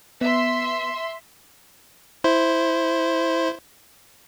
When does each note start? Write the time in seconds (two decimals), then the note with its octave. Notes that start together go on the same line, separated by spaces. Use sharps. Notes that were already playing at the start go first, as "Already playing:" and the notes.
0.21 B3 E5 C6
2.24 E4 C5